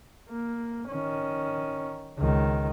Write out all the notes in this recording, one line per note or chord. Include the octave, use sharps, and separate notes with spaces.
A#3
D#3 C#4
C#2 D#3